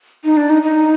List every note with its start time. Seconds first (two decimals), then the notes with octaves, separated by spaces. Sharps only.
0.24 D#4
0.37 D4
0.50 D#4
0.63 D#4